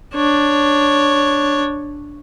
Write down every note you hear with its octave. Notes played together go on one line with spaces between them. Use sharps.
D4 C#5